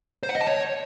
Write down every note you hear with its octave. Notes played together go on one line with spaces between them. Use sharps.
C5
F#5
D#5
A5
C#5